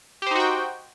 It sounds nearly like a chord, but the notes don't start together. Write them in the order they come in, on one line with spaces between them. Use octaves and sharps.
G4 C5 D#4 F#4 G5